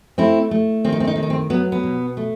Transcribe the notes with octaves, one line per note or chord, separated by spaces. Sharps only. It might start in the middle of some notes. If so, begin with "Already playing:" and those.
A3 C4 E4
A3
D#3 C4
D#4
C4
D#4
D#3 C4
D#4
C4
F#3 B3
B3
B2
A3